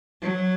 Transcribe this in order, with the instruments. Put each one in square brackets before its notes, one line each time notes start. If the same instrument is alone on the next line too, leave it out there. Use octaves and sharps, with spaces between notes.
[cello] F#3